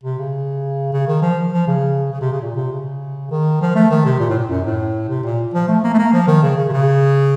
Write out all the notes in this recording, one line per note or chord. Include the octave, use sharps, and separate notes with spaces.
C3
C#3
C#3
D#3
F3
F3
C#3
C#3
C3
C#3
A#2
C3
C#3
D#3
F3
A3
D#3
C3
A#2
A2
A#2
F#2
A2
C3
A#2
F3
A3
A#3
A3
A#3
F3
D#3
C#3
C#3
C3
C#3